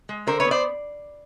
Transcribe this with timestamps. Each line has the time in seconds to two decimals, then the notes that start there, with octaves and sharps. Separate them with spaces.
0.09 G#3
0.27 D3 A#4 C5
0.40 B4 C#5
0.45 B3
0.51 C5 D5